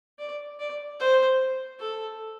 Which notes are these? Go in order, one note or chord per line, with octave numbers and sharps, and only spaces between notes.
D5
D5
C5
A4